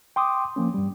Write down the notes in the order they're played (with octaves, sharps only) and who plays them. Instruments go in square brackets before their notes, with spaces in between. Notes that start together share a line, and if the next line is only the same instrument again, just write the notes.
[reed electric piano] G5 C6 D6 D#6
F3 A#3 C#4
G2 G3